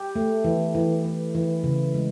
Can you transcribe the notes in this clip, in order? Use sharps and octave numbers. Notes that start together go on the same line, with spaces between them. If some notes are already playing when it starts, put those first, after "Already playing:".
Already playing: G4
A3
E3
E3
E3
E3
C#3
G#3